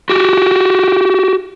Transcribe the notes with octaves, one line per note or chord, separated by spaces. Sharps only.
F#4 G4